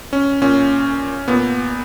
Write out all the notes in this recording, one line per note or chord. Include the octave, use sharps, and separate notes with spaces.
C#4
A#2 C#4
A#2 B3